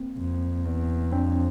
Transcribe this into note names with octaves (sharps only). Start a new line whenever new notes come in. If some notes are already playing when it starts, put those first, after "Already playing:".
Already playing: A#3 C4
F2
E2
F2 C4 D4